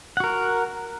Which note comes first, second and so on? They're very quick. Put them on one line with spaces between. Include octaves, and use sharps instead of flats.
F#5 F#4 A#4